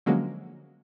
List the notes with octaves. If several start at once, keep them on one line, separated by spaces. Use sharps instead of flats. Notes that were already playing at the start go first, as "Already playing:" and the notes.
D3 F3 F#3 G#3 A#3 C#4